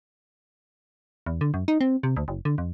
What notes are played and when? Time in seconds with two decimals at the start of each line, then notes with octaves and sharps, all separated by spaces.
1.26 E2
1.41 D3
1.54 F#2
1.68 D#4
1.81 C4
2.03 C3
2.17 D2
2.28 F#1
2.45 D3
2.58 F2